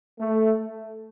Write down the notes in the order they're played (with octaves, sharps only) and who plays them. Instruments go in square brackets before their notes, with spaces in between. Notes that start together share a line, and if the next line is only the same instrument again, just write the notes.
[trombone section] A3